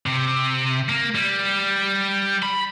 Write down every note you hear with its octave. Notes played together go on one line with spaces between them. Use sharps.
C3
A#3
G3
B5